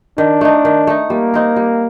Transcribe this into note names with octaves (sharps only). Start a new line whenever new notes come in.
D#3 D4
A3 D#4
D#3
A3 D#4
G3 A#3
C4 D#4 A#4
G3